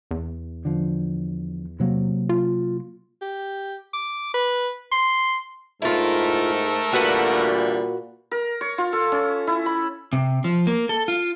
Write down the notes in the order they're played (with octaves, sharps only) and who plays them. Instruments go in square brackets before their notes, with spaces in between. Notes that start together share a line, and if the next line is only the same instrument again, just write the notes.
[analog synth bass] E2
[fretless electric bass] D3 F3
C3 F#3 A#3
[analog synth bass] F4
[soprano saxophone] G4
D6
B4
C6
[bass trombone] G#2 [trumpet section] A3 A4 A#4 [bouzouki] E4 F4
[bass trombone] A#2 [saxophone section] D3 E3 G3 [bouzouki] F#4 B4 F#5
[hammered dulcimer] A#4
C#5
F4
A4
C#4
E4
B5
[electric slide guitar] C3
F3
A#3
A4
F4